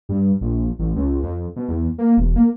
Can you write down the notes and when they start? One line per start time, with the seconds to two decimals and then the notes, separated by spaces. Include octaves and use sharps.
0.09 G2
0.41 A#1
0.79 A1
0.96 C#2
1.23 F2
1.56 B2
1.68 E2
1.98 A#3
2.17 E1
2.36 A#3